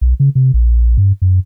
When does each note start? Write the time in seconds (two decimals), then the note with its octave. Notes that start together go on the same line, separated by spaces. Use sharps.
0.01 B1
0.20 C#3
0.35 C3
0.54 A#1
0.97 G2
1.22 F#2